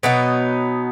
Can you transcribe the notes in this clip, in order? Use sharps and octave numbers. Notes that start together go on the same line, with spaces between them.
B2 F#3 B3 D#4